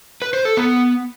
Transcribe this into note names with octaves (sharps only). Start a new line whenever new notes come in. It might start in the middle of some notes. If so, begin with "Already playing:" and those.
B4
C5
A4
B3